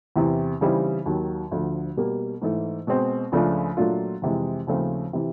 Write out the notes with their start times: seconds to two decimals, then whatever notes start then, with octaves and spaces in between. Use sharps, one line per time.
0.16 E2 C3 E3
0.61 C#3 E3 G3 C4 D#4
1.06 D#2 D#3 F#3
1.51 D2 D3 F3
1.97 B2 G3 A#3
2.41 G#2 E3 A3
2.87 B2 G#3 C4
3.32 C#2 C#3 F3 A3 D4
3.77 A#2 F#3 A3 D4 F4
4.22 F2 C3 E3 G#3
4.67 D#2 C#3 F3 A3 C4
5.13 C3 E3